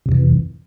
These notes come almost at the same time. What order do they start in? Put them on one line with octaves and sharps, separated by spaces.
C3 F2 E3